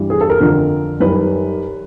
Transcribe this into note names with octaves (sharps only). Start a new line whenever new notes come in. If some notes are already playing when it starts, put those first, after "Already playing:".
Already playing: G2 E3 G3
G#4
A4
A#4
F2 D3 F3
F#2 D#3 G3 B4